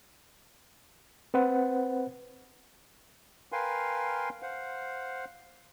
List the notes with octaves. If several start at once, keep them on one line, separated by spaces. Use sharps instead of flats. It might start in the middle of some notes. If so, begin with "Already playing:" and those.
C4 B4 C5 F#5
A#4 B4 F5 G5 G#5 C6
C5 F5 F#5